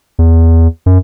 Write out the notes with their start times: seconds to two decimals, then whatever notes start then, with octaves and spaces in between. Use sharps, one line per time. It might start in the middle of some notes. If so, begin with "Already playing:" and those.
0.19 E2
0.86 F#2